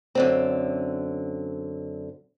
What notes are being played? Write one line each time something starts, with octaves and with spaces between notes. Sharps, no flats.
F#2 D3 C4